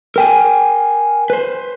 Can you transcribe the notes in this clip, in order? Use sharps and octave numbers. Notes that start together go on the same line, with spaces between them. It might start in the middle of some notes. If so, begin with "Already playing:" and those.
A#4 G5 G#5
B4 C5